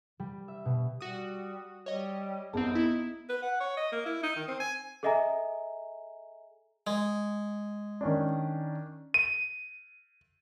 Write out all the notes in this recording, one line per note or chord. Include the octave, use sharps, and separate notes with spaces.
G3
E5
B2
G3 F#4 D#6
G3 C#5 D#5
A1 F#2 B3 C4 D#4 G#4 A5
B3 E4
B4
F#5
C#5
D#5
A#3
E4
D#4
D#3
C4
G#5
G#4 A4 D#5 E5 G#5 A#5
G#3
D#3 C#4 D4
D#7